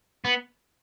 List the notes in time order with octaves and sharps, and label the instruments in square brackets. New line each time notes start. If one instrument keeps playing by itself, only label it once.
[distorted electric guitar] B3